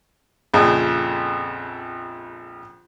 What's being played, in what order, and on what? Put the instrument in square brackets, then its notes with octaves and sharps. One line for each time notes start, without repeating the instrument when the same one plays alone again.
[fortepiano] A#1 F2 C#3